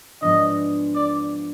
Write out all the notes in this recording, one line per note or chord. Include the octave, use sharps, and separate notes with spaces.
G#2 F3 G#3 B3 D4 D#5
D5